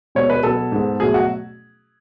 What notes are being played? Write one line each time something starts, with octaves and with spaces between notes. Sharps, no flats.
B2 G#3 B3 C#5
B4
B2 F#3 B3 A4
G#2 G#3 B3
B2 F#3 A3 G#4
F#4